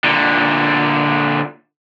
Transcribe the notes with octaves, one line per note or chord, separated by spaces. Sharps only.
A#2 D3